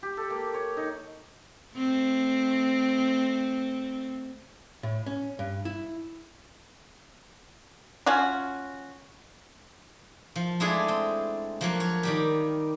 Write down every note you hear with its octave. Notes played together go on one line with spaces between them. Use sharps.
G4
A4
A#3
C#5
D#4
A3 C4
A2
C#4
G2
E4
C#4 F4 F#4
F3
G#3 A3 D4 E4 G#4
C4
F3 F#3 A#3
C#5
D#3 G3 G4